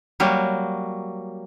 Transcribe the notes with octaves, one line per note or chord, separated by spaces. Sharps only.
F#3 G3 A#3